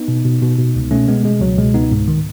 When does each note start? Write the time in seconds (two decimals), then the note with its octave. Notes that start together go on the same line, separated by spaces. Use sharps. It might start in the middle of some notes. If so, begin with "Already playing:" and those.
Already playing: B3 D#4
0.08 B2
0.25 B2
0.42 B2
0.58 B2
0.75 C#2
0.91 B2 A3 C#4
1.08 B2 G#3 B3
1.24 B2 G#3
1.41 C#2 F#3
1.58 B2 G#3
1.74 C#2 B3 D#4
1.91 G#2
2.08 D#3